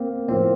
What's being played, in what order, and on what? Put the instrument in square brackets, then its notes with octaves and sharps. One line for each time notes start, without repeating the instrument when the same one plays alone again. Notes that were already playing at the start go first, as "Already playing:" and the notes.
Already playing: [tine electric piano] A#3 C4
[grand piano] A2 F3 C4 [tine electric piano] A#3